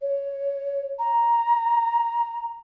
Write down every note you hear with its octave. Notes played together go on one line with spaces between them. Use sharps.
C#5
A#5